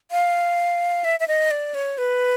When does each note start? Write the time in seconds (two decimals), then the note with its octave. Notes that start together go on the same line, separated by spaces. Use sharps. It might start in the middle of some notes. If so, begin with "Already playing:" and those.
0.11 F5
1.04 E5
1.20 E5
1.28 D#5
1.51 D5
1.74 C#5
1.98 B4